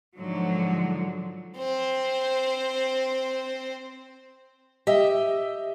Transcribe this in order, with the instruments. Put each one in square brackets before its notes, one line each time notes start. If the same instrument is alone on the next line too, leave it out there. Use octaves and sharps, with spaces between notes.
[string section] G#2 D3 F3 F#3
[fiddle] C4 C5
[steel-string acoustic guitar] G4 D#5 E5